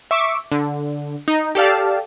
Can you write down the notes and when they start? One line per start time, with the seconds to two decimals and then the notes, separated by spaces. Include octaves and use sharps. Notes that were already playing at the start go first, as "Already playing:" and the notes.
0.11 E5 C#6 D6
0.52 D3
1.28 D#4
1.55 G4 A4 D5 F5 A5